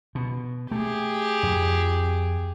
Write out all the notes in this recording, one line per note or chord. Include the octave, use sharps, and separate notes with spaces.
B2
A3 G4 G#4
F2